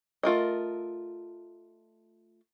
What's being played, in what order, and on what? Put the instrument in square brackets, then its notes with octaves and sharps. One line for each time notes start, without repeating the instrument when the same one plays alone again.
[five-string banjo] A3 F4 A#4 D#5